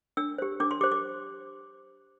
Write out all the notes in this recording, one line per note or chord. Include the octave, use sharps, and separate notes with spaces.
D4 E6
G4 C5
D4 D6
C6
G4 C5 D6
D6